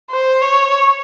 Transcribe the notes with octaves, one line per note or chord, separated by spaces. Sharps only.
C5
C#5